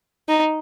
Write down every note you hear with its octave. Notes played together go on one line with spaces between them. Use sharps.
D#4